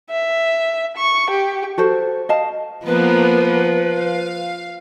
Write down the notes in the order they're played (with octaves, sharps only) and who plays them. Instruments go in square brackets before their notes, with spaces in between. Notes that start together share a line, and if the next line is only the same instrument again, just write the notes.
[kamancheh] E5
C#6
G4
[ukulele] F#4 A4 C5
D#5 F5 A5
[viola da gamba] F3 [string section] A#3 B3 A#4 [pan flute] B4
[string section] F5